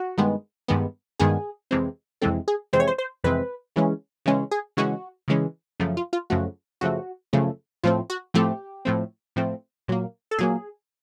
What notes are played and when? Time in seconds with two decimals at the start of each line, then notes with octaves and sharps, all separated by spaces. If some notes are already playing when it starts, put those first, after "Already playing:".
Already playing: F#4
0.18 G2 D#3 G#3 B3
0.68 G2 D#3 G#3 B3
1.19 G2 D#3 G#3 B3 G#4
1.71 F2 C3 E3 G#3 C4
2.22 F2 C3 E3 G#3 C4 A4
2.48 G#4
2.73 F2 C3 E3 G#3 C4 C5
2.80 C#5
2.87 C5
2.98 C5
3.24 F2 C3 E3 G#3 C4 B4
3.76 C#3 E3 G#3 C#4
4.26 C#3 E3 G#3 C#4
4.51 G#4
4.77 C#3 E3 G#3 C#4 F#4
5.28 C#3 E3 G#3 C#4
5.80 F#2 C#3 F3 A3
5.97 F4
6.13 F4
6.30 F#2 C#3 F3 A3 F#4
6.81 F#2 C#3 F3 A3 F#4
7.33 F#2 C#3 F3 A3
7.83 A2 F3 A3 C4 F4
8.10 F#4
8.34 A2 F3 A3 C4 G4
8.85 A2 F3 A3 C4
9.36 A2 F3 A3 C4
9.88 A#2 F#3 A#3
10.31 A4
10.38 A#2 F#3 A#3 G#4